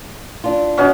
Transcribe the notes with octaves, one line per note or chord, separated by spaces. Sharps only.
D4 F4
B2 C#4